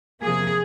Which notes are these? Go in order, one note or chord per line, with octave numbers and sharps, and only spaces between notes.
C3 F3 A#3 G#4